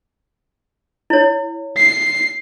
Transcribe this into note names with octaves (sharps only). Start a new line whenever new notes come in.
E4 C#5
C7